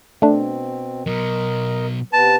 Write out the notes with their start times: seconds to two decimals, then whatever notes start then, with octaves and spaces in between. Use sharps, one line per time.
0.22 B2 A3 C4 D4
1.06 B2 F#3 A#4 D#5
2.13 C3 B3 B4 A5